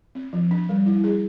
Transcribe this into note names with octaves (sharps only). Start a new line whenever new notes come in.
C4
F3
D4
G3
E4
G#4